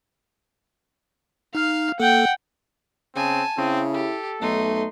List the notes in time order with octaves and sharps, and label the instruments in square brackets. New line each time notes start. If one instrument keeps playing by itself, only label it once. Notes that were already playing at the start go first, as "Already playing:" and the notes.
[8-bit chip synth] D#4 F6 [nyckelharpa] F5
[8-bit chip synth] A#3 A4 [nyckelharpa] F#5 G5
[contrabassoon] C#3 [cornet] C4 [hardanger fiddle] G#5 A5
[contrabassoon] C#3 [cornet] C4 [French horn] E4
[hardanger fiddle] G4 [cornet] A4
[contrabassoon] B1 [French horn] A3 [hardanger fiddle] D#4 C6